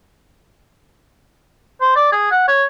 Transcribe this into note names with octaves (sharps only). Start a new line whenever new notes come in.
C5
D5
G#4
F#5
C#5